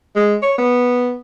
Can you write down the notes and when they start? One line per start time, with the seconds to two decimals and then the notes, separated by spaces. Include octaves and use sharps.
0.16 G#3
0.43 C#5
0.58 B3